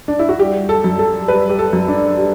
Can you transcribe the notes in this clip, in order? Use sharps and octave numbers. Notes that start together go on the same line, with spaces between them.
D4
E4
F#4
G3 G4
A4
F#2
A4
G3 B4
G4
A4
F#2
D4
G3